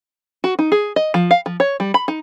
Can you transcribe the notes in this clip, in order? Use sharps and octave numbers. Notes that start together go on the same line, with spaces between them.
F#4
D#4
G#4
D#5
F3
F5
F3
C#5
G3
B5
D#4